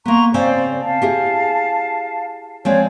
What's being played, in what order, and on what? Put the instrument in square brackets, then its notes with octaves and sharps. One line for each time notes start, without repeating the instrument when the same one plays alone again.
[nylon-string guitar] A#3 B3 [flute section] A#5 C6 C#6
[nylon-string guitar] C#3 C4 F5 [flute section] C5 D5
[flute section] F5 A5
[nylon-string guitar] E4 G4 G#4
[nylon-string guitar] F3 G#3 C4 [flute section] C#5 D5